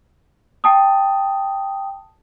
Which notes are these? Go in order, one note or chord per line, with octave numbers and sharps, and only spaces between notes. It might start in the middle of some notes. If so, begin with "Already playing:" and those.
G5 A5 D#6